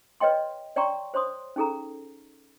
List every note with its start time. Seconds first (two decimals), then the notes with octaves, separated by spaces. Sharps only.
0.20 B4 C#5 D#5 G5 C6
0.76 C#5 D5 G5 A#5 C6 C#6
1.14 C5 C#5 C6 D#6
1.56 C#4 D#4 G#4 A4 A#5